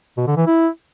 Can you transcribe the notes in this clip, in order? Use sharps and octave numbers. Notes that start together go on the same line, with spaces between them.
B2
D3
E3
E4